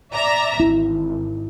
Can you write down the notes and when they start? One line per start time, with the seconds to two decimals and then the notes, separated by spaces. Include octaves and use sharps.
0.13 D5 E5 A#5
0.60 G#1 E4